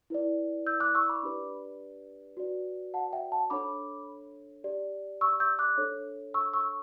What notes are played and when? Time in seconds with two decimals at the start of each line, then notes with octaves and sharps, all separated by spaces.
0.10 E4 B4 D5
0.67 E6 G6
0.80 D6 F#6
0.95 C#6 E6
1.09 B5 D6
1.23 D4 G4 B4 D5
2.37 F#4 B4 D5
2.94 F#5 A5
3.13 E5 G5
3.32 F#5 A5
3.50 D4 A4 C#5 B5 D6
4.64 G4 D5
5.21 C#6 E6
5.40 E6 G6
5.59 D6 F#6
5.77 D4 A4 C#5
6.34 C#6 E6
6.54 C#6 E6